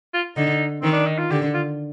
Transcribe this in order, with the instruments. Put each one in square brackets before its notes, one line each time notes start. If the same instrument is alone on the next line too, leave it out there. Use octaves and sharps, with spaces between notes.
[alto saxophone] F4
[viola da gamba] D3 [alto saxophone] D#4
[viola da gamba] D#3 [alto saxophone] C4
[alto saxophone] D4
D#4
F4
[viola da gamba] D3 [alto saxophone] G4
[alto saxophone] F4